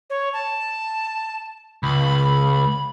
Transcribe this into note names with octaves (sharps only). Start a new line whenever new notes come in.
C#5
A5
C#2 B5